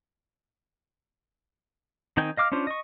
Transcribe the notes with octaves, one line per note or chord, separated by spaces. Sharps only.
D#3 C4 D#4 G5 G#5
D#5 F5 D6 F6
C#4 D4 F4 C5
D#5 C#6